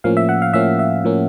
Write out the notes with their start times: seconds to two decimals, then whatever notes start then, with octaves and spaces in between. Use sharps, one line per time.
0.04 A2 F3 A#3 C#4 F5
0.17 E5
0.29 F#5
0.42 F5
0.54 A2 F3 A#3 C#4 E5
0.79 E5
1.04 A2 F3 A#3 C#4